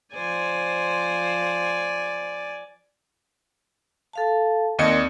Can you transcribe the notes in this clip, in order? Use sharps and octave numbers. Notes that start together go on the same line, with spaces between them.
F3 C5 D5 G#5
A4 F5 A5
D#2 C4 A#4 D5 D#5 C#7